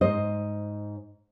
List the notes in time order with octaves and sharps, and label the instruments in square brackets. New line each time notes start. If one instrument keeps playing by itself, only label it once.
[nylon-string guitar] G#2 C5 D#5